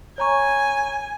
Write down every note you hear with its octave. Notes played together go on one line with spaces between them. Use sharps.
C#5 G#5 A#5 C#6